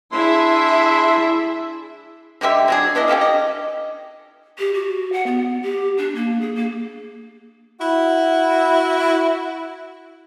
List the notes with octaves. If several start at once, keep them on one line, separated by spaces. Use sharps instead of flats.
D4 E4 G#4 E5 C6
D3 G#3 G4 E5
F#3 D4 G#4
B3 D4 E4 D#5
C#4 G4 A4 F5
D#5
G4
F#4
F#5
B3
G4
D4
A#3
G#4
A#3
E4 F#4